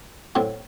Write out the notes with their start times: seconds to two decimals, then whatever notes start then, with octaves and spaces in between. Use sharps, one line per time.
0.35 A2 F#3 C4